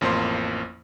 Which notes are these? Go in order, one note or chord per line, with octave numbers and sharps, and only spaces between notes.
A1 F2 A#3 C5 C6